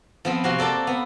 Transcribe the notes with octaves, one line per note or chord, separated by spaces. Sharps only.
F3 B3 C4
C3 F#4 F5 C6
A#3 A4 D5 A5
B3